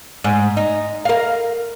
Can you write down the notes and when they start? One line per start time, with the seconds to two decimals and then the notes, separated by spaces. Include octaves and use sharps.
0.24 G#2
0.57 D#4
1.05 A#4 F5